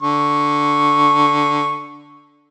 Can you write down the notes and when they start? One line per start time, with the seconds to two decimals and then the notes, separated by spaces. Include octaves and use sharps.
0.02 D3 C#6